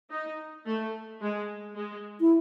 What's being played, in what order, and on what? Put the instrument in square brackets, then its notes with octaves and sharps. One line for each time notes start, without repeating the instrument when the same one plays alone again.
[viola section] D#4
A3
G#3
G#3
[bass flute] E4